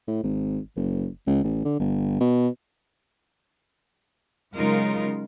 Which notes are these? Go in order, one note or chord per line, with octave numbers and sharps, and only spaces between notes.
A2
G#1
F#1
C#2
A1
D3
G1
B2
C#3 F#3 G#3 D#4 F4 A#4